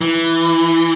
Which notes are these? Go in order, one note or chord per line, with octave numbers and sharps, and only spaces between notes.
E3